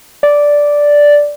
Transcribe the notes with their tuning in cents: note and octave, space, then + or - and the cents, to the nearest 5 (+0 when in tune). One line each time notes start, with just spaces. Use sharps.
D5 -5